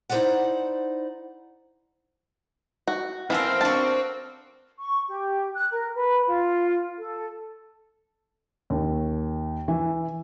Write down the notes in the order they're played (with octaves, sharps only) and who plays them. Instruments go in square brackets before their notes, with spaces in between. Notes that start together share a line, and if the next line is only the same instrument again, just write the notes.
[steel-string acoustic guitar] D#4 E4 A4 C5 D5 F#5
[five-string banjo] F#4
[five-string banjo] E3 [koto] B3 A4 A#4 [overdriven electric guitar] C4 C5 [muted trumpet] F5
[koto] D4 F#4 [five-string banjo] A5
[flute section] C#6
G4
F#6
A#4
B4
F4
A4
[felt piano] D#2
E3